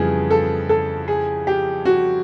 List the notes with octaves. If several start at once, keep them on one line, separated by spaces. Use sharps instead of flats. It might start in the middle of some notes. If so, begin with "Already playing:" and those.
Already playing: F2 C#3 E3 G3 B3 F4 G#4
A4
A4
G#4
G4
F#4